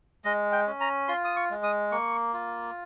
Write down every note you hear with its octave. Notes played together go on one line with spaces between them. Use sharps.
G#3 D#5
G5
C#4
A#5
F4 C6
D#6
C#6
G#3
D#6
A#3 C#6
F4